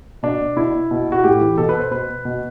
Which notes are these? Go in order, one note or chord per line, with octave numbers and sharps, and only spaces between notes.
B2 D4
B2 E4
B2
F#4
A2 G4
E3
B2 A4
B4
C5
B2 B4
B2